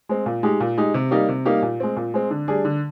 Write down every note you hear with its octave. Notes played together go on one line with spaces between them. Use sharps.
G#3 C4
A#2
G#3 D#4 G4
A#2
G#3 D#4 G4
C3
G3 A#3 D#4 G4
C3
G3 A#3 D#4 G4
A#2
G#3 C4
A#2
G#3 C4
D3
G3 D4 G#4
D3